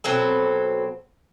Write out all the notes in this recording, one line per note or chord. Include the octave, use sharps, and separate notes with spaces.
B2 F#3 C4 A4